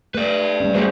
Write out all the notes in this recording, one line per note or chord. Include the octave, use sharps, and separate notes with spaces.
A3 B4 D5
G3 A3 C#4
E3 A3 F#4 G#4 C5